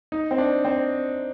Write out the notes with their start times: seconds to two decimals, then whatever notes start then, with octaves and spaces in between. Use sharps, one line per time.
0.12 D#4
0.31 C4
0.38 D4
0.65 C4